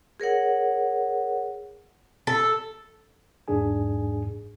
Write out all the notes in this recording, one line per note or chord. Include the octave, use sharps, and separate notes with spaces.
G#4 A#4 C#5 F#5
A4
G1 E2 G#2 D4 G#4 G#5